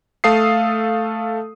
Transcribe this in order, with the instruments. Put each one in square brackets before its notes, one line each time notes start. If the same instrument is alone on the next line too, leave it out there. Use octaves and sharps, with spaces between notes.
[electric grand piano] A3 A4 F5 D#6 C7